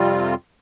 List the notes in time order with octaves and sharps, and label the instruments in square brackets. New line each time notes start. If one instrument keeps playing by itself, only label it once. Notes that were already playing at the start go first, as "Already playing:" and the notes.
Already playing: [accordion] F2 C3 G3 C4 F4